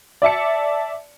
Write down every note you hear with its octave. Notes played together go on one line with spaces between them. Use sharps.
D5 E5 A5 C#7